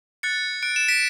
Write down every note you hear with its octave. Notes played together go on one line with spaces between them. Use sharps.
F#6 A6 C#7
F#6 D7
E7
B6 D7